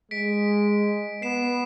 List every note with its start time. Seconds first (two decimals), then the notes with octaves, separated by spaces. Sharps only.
0.11 G#3 B6 D7
1.22 B3 C7 E7